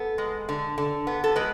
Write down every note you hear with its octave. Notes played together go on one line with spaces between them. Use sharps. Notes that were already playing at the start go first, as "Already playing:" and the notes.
Already playing: B3 A4
G#3
D3
D3
B3
A4
G#3 B4